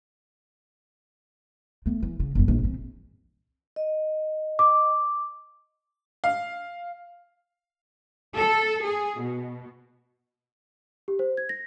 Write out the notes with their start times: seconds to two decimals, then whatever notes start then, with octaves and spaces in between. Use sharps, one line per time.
1.86 A3 B3
2.03 E3
2.20 C#3
2.35 G1 F#2
2.48 A#1 D#3
2.63 E3 C4
3.76 D#5
4.59 D6
6.24 F5
8.35 A4
8.82 G#4
9.20 B2
11.08 G4
11.19 C5
11.37 G#6
11.49 A#6